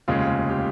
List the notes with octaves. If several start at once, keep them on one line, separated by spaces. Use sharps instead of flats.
F1 D#2 C#3 G#3 F4
G4